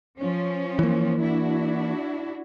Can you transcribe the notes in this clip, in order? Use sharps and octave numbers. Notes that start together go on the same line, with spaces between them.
F3 C#4
E3 A#3
D4 E4 F#4